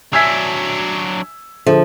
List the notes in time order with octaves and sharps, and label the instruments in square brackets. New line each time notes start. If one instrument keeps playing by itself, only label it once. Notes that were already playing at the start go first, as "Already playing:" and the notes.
[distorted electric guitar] F#3 D4 [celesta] E5 G#5 C7 [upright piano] E6 G#6 B6
[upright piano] D3 [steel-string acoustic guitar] F3 [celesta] G#4 A4 E5